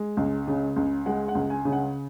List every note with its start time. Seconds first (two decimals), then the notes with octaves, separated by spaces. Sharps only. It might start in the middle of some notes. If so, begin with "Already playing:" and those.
Already playing: G#3
0.17 C#2
0.47 C#3
0.76 C#2
1.06 G#3 F#5
1.28 F#5
1.35 C#2
1.50 G#5
1.65 C#3
1.72 F#5